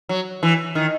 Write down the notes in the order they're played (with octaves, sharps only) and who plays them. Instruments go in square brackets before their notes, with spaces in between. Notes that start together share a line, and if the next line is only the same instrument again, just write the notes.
[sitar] F#3
E3
D#3